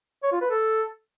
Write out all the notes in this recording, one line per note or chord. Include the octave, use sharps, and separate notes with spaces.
C#5
F4
B4
A4